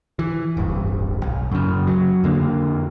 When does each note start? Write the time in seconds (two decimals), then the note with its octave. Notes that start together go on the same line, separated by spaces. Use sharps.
0.19 E3
0.57 D1 G1 G2
1.23 B1
1.52 F#2 C#3
1.87 F#3
2.24 F2 D3 A#3